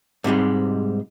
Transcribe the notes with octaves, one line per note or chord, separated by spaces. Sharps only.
G#2 C3 G3 G#3